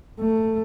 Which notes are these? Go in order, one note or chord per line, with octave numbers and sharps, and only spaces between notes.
A3